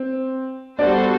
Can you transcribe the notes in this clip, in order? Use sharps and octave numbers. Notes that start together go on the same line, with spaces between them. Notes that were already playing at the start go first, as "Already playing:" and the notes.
Already playing: C4
G3 B3 D4 F#4 A4 C5